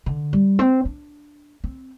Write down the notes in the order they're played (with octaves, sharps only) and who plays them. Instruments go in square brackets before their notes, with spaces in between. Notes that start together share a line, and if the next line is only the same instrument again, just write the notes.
[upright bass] D3
G3
C4
D4
C4